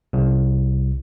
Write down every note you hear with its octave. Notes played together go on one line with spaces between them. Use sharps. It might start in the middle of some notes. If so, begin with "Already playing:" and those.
C2